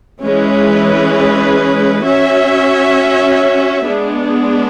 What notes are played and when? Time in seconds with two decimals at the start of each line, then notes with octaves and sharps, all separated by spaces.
0.22 E3 G#3 C#4 G#4 B4
2.04 C#4 F#4 C#5 E5
3.86 G#3 B3 D4 G#4